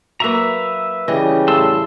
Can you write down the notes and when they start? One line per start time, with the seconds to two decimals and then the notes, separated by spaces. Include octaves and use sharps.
0.20 F#3 A#3 B4 E5 A#5
1.08 C#3 E3 G3 D#5
1.48 A2 A5 C6 E6